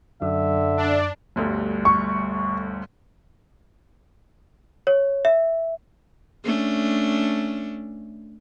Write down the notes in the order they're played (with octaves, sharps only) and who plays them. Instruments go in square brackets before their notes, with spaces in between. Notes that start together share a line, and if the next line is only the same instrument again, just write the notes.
[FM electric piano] F#2 [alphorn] D3 [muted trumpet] E5
[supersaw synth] D4
[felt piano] G1 D2 G2
[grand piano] C#6
[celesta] C#5
E5
[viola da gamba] A3 C#4 D4